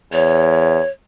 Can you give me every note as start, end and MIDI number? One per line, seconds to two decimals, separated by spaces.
0.13 0.81 40
0.13 0.89 73